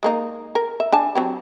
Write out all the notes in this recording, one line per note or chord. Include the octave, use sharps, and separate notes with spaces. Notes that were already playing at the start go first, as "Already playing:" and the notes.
G#3 A#3 D#4
A#4
E5
D4 G#5 A5
F#3 C4 G4